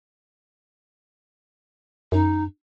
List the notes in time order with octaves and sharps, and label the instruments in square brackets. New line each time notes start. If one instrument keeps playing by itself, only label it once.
[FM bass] F#2 [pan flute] D#4